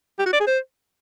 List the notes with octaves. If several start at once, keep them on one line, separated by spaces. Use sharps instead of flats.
G4
F#4
D5
G#4
C5